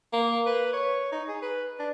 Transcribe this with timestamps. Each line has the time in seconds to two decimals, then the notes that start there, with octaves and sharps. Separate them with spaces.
0.13 A#3
0.46 B4
0.73 C#5
1.12 D#4
1.28 G#4
1.42 B4
1.79 D4